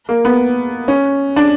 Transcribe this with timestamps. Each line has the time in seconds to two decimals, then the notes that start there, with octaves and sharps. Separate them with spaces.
0.09 A#3
0.25 B3
0.88 C#4
1.36 D4